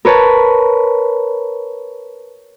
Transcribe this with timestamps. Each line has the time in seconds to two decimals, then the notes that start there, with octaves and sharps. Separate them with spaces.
0.05 A#4 B4 C#5 A5